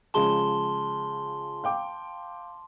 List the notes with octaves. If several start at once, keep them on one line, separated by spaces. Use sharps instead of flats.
C#3 F3 G#3 A5 C6 G7
F5 G5 D6